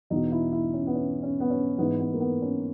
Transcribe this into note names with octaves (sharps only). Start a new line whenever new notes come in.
E2 B2 D#4
E4
E4
C#4
B3
C#4
C#4
B3
C#4
G#2 E3 B3
B3
A#3
B3
C#4